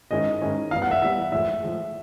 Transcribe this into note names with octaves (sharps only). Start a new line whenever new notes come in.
G#2 D#3 G#3 C#4 E4 D#5
G#2 D#3 G#3 C#4 E4
E3 G3 B3 F5
F#5
E5
E3 G3 B3 E5
A2 F3 G#3 E5
A2 F3 G#3